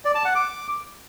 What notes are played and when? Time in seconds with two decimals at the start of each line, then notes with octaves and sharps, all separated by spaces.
0.05 D5
0.15 A5
0.25 F#5
0.35 D6